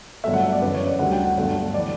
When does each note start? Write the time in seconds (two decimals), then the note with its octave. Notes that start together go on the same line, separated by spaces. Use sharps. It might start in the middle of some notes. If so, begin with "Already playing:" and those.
0.24 G1 G2 F#3 A3 E5
0.33 F#5
0.43 E5
0.53 D5
0.62 F#2 C#3 E3 B4
0.74 C#5
0.87 D5
0.99 D2 D3 G3 F#5
1.12 G5
1.24 F#5
1.37 G1 G2 D3 F#3 A3
1.74 E3 D5